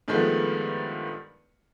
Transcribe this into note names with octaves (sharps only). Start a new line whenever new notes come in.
G2 D#3 F3 G#3 A3 B3